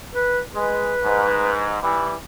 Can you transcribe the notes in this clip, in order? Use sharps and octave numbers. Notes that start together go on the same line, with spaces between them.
B4
G#3 B4
G#2
E3 G3